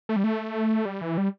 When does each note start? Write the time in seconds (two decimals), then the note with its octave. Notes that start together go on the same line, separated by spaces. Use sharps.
0.09 A3
0.16 G3
0.24 A3
0.85 G3
1.01 E3
1.18 G3